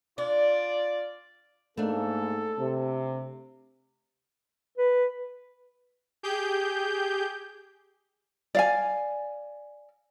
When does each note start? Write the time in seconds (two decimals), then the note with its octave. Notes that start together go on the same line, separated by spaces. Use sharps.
0.18 D4 F4 D5
1.77 G#2 A3 A#3 D4 A4
2.58 C3
4.78 B4
6.23 G4 G#4 G6
8.55 D5 F5 G#5